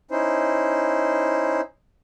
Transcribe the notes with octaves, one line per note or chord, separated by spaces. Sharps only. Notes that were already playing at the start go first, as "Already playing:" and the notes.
C#4 D#4 E4 C5